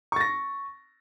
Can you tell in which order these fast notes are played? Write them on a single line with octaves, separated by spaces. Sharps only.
C#6 A6 A#6